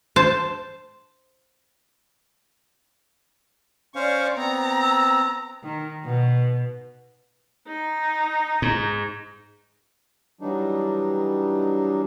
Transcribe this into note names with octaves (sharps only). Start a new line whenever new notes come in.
C5 A5
C#4 C5 D5 F5 C#6
B3 C4 A#5
E6
D#3
B2
D#4
G#2
E3 F#3 G3 D4 D#4